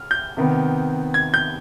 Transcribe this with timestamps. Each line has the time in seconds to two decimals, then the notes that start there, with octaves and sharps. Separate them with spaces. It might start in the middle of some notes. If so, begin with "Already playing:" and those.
Already playing: F6
0.11 G6
0.37 C3 D#3 B3
1.14 G#6
1.34 G6